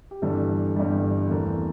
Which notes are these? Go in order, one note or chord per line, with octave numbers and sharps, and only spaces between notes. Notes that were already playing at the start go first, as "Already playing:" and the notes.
G4
G1 G2 E3 G3 A4
G1 G2 E3 G3
E2 E3 A3 C4 A#4